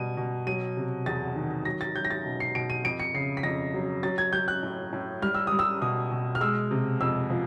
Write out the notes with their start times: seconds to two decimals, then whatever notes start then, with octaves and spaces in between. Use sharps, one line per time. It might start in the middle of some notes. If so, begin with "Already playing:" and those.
Already playing: B2 G3 D#7
0.17 B2
0.47 F#3 D#7
0.77 C3
1.06 E2 A6
1.36 D#3
1.65 F#3 A#6
1.81 A6
1.95 F#3 G6
2.05 A#6
2.10 A6
2.25 B2
2.40 C7
2.55 B2 D7
2.70 D#7
2.84 F2 D7
3.00 C#7
3.14 C#3 C7
3.37 B6
3.43 F2 A#6
3.74 F#3
4.03 F#3 A6
4.18 G#6
4.33 F#3 G6
4.48 F#6
4.63 A2
4.93 A2
5.22 G3 F6
5.35 E6
5.47 G3 D#6
5.59 E6
5.81 B2 D#6
6.11 B2
6.35 F6
6.41 G#3 E6
6.71 C3
7.01 F2 E6
7.30 F3